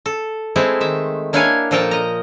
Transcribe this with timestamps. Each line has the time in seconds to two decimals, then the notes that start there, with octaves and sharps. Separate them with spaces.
0.06 A4
0.56 G#3 A3 C4 E4
0.81 D#3 E5
1.33 A#3 D4 E4 C#5 F5 G#5
1.71 A#2 F3 A4 A#4 G5 A5
1.91 D#5 A#5